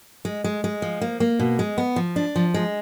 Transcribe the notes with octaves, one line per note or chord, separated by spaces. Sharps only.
G#3
G#3
G#3
F3
A#3
A#3
B2
G#3
B3
F3
D4
F3
G#3